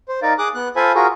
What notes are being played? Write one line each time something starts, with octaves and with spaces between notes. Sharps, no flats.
C5
D#4 A#4 D5 F5
G#4 D6 D#6 F#6
B3 F#6
F4 A4 C5 F5 G#5 B5
F4 F#4 G#4 A#4